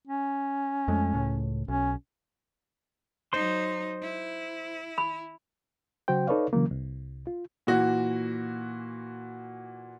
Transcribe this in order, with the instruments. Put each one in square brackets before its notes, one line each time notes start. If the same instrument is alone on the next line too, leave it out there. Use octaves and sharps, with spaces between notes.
[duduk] C#4
[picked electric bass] F2 G#3 A3
C#2 A2
[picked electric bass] B1 [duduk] C#4
[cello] F#3 D#4 [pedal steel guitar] C5 C6
[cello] E4
[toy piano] B5
[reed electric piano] C#3 F#3 F#4 C5 G5
D#4 A4 B4 C#5 D5 F5
C#3 E3 F#3 A#3
C2
F4
[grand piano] A#2 E3 F#4